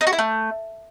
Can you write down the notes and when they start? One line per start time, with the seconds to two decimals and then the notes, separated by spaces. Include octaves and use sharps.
0.01 D#4
0.07 F#4
0.13 E4
0.19 A3